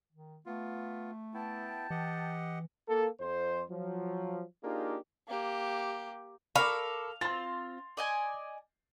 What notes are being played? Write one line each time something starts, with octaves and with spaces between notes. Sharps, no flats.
D#3
A3 B3 F4
B3 E4 G5 A5
E3 G4 D#5 F#5
A#3 A4
F2 C5
F3 F#3
A#3 D4 D#4 F4 G4 G#4
A#3 G4
A4 A#4 F5 B5 C#6 D6
C4 F4 C6 A6
D5 D#5 G#5